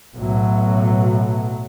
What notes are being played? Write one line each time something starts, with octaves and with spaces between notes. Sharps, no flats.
B1 A2 F#3